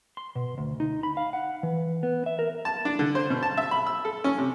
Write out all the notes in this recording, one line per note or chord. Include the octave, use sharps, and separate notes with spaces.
C6
B2
D2
D#4
B5
F5
F#5
E3
B3
E5
A#4
A5
D4
D3
C5
B2
A5
E5
B5
E6
A4
C#4
C3